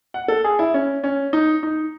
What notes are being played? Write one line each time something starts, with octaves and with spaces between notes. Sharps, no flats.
F#5
A4
G#4
E4
C#4
C#4
D#4
D#4